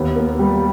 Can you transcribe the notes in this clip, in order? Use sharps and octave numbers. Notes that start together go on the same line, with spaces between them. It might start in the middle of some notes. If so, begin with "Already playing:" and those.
Already playing: D#2 B3
A#3
G3